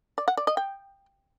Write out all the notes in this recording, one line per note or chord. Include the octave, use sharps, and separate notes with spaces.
D5
F#5
D5
D#5
G5